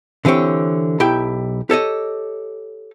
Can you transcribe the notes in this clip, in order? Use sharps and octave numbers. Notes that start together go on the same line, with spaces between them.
D3 E3 C4 G4 C#5
B1 E4 G4 G5
G4 A4 C#5 D#5